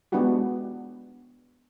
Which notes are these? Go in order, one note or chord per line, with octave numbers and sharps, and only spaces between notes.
G#3 B3 D4 E4 F#4 G4